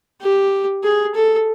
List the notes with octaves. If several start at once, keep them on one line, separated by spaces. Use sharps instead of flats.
G4
G#4
A4